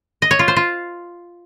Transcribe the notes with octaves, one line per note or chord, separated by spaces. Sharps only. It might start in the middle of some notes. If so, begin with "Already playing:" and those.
D#5
C#5
F4
C5
F4